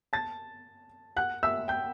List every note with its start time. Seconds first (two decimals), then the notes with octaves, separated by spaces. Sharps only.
0.13 A5 A6
1.17 F#5 F#6
1.43 E5 E6
1.68 G5 G6